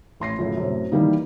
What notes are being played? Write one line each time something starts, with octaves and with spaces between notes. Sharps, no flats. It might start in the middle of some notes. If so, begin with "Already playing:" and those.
A1 C6 A#6 C7
C#2 F#2 A2
F#2 A2 C3
D#3 E3 G3 A#3 D#4